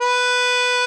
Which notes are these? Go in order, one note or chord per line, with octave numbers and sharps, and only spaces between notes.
B4